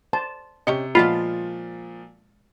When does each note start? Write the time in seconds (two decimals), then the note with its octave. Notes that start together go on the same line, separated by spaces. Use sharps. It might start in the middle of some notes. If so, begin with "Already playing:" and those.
0.13 C5 A5
0.67 C3 C#4 G4 D#5 C#7 G7
0.95 A#2 F3 G#3 B3 D4 F4 B5